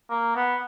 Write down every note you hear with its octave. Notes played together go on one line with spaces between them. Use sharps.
A#3
B3